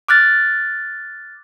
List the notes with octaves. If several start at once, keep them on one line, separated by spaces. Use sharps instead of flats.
D6 F6 F#6 A6